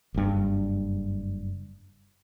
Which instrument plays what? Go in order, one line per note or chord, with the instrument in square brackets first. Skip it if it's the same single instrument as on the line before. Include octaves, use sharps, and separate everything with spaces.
[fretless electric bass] F#1 G2